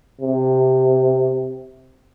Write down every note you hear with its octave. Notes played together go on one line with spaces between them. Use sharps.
C3